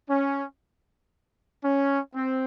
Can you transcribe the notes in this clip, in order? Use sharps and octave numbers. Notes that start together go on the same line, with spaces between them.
C#4
C#4
C4